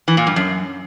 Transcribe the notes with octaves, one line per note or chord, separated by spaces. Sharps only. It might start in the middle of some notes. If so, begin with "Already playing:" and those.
E3
A#2
G2
F#2